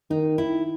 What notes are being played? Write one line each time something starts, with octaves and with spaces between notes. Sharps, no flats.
D#3 D#4
E4